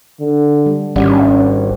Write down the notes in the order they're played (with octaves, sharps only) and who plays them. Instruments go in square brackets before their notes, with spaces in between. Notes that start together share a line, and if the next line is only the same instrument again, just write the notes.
[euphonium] D3
[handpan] G3
[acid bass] G#1 [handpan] G3 D5 F#5 [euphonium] C#4